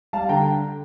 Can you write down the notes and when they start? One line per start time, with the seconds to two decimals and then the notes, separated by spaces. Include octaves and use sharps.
0.13 G3 F5 A5
0.29 D3 G5 A#5